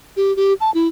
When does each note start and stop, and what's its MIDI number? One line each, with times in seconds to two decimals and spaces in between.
0.17 0.35 67
0.36 0.53 67
0.61 0.71 81
0.74 0.88 64